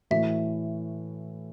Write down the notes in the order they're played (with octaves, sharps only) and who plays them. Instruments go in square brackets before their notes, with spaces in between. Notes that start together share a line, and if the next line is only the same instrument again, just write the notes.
[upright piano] A2 E3 A3 F#4 [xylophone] E5